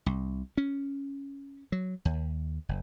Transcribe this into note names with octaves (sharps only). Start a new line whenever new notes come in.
C2
C#4
F#3
D#2
F#1